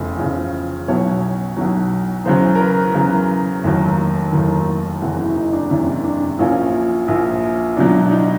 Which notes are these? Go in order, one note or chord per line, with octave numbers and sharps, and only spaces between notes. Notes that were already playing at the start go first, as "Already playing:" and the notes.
Already playing: F1 E2 C#3 F3
F1 E2 C#3 F3
B1 B2 F#3 C#5
B1 B2 F#3
E2 C#3 F#3 C5
A#4
B4
E2 C#3 F#3 A#4
F1 D#2 D#3 F#3
F1 D#2 D#3 F#3
F#1 E2 C3 E3 F#4
E4
D#4
D4
F#1 E2 C3 E3 C#4
D4
A#1 A#2 F3 C#4
A#1 A#2 F3
C#2 B2 F#3 D4
D4
D#4